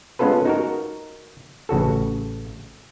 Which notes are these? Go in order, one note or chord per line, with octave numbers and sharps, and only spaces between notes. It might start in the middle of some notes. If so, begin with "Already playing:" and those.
G#3 B3 C#4 F4 A4 B4
D#4 F#4 A#4
A1 C#3 F#4 A4